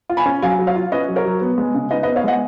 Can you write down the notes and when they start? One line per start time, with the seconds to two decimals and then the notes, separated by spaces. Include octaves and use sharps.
0.10 F4
0.17 G#5 B5
0.26 C#4
0.42 F#3 F5 G#5
0.59 F#3
0.67 C#5 F5
0.76 F4
0.92 C#4 B4 D#5
1.08 F#3
1.16 A#4 C#5
1.25 F#3
1.41 B3
1.58 G#3
1.75 C#3
1.91 D#4 B4 D#5
2.03 B4 D#5
2.07 B3
2.16 C#5 F5
2.24 G#3 D#5 F#5